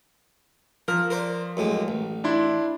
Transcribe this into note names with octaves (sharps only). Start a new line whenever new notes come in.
F3 A#4 F6
A#4 C5 D5
F#2 A2 G#3
A1
D4 E4 C6